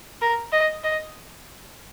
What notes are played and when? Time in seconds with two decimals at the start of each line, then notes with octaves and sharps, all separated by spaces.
0.21 A#4
0.52 D#5
0.84 D#5